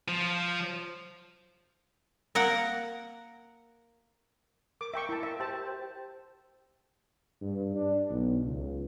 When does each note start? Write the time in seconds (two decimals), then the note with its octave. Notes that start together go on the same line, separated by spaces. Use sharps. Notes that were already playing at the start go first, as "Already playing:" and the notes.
0.08 F3
2.35 A#3 A#4 F#5
4.81 A#4 D6
4.94 E5 G5 C#6
5.09 E4 A5
5.23 E5
5.40 G4 C5 E5 G5 A5
7.42 G2
7.76 D4
8.10 B1
8.45 C#2